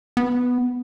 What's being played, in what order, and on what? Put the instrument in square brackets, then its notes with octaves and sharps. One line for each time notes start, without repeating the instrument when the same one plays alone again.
[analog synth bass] B3